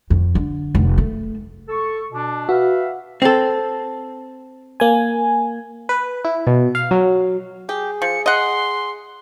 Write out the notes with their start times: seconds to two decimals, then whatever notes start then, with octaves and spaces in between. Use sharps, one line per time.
0.10 F2
0.35 D3
0.75 F1
0.98 A3
1.68 A4 C#6
2.12 B2 D4
2.49 F#4 B4 E5 F5
3.22 C4 A4
4.80 A#3 G#5
5.89 B4
6.25 E4
6.47 B2
6.75 F5
6.91 F#3
7.69 G4 G#4
8.02 F3 C#7
8.26 D#5 F#5 C6